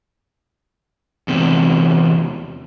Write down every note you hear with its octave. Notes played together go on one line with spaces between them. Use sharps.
E2 C3